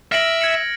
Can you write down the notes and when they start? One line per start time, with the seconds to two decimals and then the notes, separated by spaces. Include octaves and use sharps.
0.12 E5 F6 A#6 D7 F#7
0.41 G#6 C#7 F#7